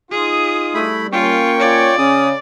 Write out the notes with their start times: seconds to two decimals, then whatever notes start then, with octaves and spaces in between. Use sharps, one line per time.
0.12 D#4 F4 G#4 D#6
0.75 G3 A3 E4 B5
1.12 A#3 C#4 F4 G5 C#6
1.60 F4 C#5 D5
1.98 C#3 C#4 D#6